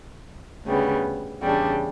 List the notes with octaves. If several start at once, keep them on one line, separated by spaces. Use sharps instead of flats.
D2 C#3 G3 B3
E2 C#3 G3 D4